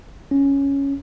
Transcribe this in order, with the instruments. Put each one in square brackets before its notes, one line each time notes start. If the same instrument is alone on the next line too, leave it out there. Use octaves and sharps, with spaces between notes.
[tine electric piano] C#4